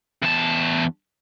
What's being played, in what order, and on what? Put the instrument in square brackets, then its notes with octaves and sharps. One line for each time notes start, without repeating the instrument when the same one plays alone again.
[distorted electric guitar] E2 A5